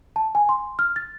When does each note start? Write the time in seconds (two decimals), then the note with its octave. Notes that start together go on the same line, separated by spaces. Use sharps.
0.16 A5
0.35 G#5
0.49 C6
0.79 F6
0.96 A6